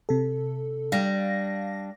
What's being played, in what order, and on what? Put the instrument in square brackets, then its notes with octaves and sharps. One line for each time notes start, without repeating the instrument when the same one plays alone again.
[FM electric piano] C3 A4
[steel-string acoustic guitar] G3 D4 [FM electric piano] F5 A#6